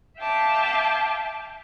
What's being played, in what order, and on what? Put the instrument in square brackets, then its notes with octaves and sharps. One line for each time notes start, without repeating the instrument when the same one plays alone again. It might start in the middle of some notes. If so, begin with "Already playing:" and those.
[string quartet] E5 F5 G5 A5 D6